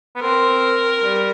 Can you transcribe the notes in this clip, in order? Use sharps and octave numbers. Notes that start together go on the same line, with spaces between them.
B3
C4 A#4
G3